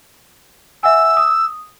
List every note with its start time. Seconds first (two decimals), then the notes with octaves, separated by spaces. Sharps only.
0.83 E5 F#5 G#5 E6
1.17 D#6